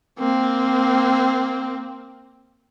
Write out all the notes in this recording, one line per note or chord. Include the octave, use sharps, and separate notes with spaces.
A#3 C4